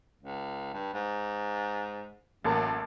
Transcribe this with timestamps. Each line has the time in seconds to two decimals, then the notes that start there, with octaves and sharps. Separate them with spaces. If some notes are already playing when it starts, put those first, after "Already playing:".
0.23 C#2
0.73 G2
0.94 G#2
2.44 A1 F#2 A#3 A5